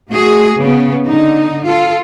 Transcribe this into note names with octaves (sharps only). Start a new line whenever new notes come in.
A3 F#4 G#4
C#3 B3
D3 D#4
F4 A4